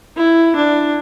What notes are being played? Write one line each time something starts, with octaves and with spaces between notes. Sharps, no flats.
E4
D4